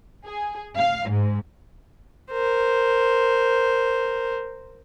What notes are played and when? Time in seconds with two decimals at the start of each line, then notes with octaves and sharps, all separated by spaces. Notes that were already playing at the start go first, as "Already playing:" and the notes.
0.25 G#4
0.77 F5
1.09 G#2
2.31 A#4 C5